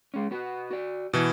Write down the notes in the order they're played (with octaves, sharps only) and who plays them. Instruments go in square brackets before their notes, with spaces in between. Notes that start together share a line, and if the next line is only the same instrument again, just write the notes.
[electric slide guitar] G#3 C#4
B3 F#4 B4
F#4 D5
[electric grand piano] B2 E3 [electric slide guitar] E4